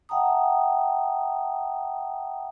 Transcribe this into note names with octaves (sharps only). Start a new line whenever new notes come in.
E5 F#5 G5 A5 A#5 D#6